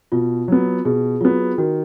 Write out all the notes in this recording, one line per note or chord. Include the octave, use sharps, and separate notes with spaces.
B2 F4
F#3 B3
B2 G#4
F#3 B3 F4
D#3 F#4